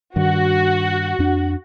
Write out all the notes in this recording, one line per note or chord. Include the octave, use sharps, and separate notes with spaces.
G2 D#3 F#4
F2 D4